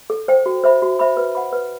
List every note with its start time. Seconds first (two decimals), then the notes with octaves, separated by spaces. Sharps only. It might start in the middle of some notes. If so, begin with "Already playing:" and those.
0.10 A4
0.28 C5 G5
0.46 F#4
0.64 C5 E5 B5
0.82 F#4
0.99 C5 E5 B5
1.17 B4
1.35 F#5 B5
1.53 B4